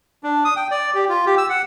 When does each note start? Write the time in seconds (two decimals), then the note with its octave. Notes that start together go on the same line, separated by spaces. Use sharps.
0.23 D4
0.45 D#6
0.56 G5
0.71 D5
0.95 G4
1.09 F4
1.26 G4
1.38 E6
1.49 F#5